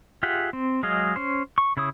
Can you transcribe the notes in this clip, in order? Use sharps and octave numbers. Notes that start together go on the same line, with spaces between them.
F4 G4 G#4 E5 F#5
C4
F#3 G#3 G#4 D#5 F5
C#4 C5
C#6
C#3 E4 C#5 D#6